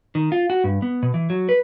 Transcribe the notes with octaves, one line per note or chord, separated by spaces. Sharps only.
D#3
F4
F#4
G2
B3
B2
E3
F#3
B4